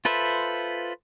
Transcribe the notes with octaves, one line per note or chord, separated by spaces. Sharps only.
F4 A4 B4 C5 E5